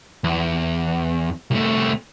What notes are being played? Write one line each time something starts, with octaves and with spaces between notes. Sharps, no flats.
E2
C2 A3